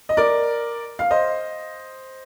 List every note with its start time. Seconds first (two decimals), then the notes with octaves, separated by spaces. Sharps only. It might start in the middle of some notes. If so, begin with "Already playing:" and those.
0.09 D#5
0.17 A#4 D5
0.99 F5
1.11 C5 D#5